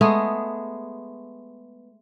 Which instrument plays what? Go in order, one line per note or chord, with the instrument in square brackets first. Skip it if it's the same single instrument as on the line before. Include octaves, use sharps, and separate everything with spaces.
[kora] G#3 A3 B3 G#4